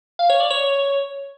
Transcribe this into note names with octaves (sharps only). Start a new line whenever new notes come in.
F5
C#5
D5
C#5